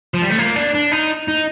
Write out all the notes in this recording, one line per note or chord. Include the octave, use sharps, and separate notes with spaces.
F3
G3
A3
A#3
D4
D4
D#4
D#4